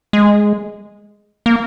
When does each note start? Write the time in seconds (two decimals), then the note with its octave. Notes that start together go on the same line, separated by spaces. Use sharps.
0.13 G#3
1.46 A#3